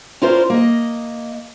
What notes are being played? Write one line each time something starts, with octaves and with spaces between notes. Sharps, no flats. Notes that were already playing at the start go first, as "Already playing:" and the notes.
C#4 E4 F4 A#4 C5 D5
A#3 D#5